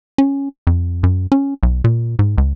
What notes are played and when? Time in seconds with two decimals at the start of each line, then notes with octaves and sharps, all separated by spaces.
0.18 C#4
0.67 F2
1.03 F#2
1.32 C#4
1.63 B1
1.84 A#2
2.19 G#2
2.38 C#2